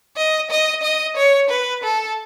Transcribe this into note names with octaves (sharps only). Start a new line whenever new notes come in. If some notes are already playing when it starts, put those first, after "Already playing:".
D#5
D#5
D#5
C#5
B4
A4